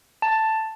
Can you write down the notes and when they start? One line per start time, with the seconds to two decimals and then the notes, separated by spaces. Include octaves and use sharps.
0.22 A5